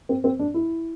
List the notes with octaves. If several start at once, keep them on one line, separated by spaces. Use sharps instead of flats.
C4
C4
D4
E4